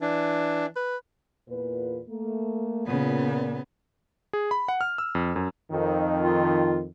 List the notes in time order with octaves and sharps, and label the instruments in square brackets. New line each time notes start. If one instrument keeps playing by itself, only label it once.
[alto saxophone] E3 [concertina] D4
[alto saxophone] B4
[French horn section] E2 A#2 B4
A3 A#3
[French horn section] A#2 [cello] C#3 B3
[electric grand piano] G#4
B5
F#5
F6
E6
F2
F#2
[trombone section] F2 D#3
[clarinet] F4